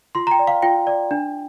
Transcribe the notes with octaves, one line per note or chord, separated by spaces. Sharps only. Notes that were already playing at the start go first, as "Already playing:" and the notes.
F4 C6
A#5
G5
D5
F5
F4 G5
D5
D4